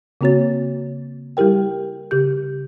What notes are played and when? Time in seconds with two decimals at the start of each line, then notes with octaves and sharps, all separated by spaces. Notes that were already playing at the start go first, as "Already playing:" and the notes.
0.21 C#3 A#3 C4 F#4 C#5 A6
1.37 G3 E4 G4 A#4 G5
2.11 C#3 G4 G6